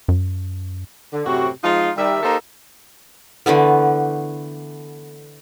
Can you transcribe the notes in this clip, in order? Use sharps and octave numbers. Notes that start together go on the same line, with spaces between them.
F#2
D3
F#2 A2 C3 C4 F#4
F3 G#3 D#4 F4
D#3 G3 E5
A#3 D#4 G4 A4 A#4 C5
D3 E3 A3 B3